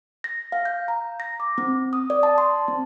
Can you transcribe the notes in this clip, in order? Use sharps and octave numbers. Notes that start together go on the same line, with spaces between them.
A#6
F5
G6
A#5
A#6
D6
C4
D#6
D5
A5
C6
C4